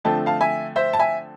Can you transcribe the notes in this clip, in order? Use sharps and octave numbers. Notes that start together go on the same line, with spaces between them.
D3 F3 A3 C4 A5
F5 A5
E5 G#5
C5 E5
A5
E5 G#5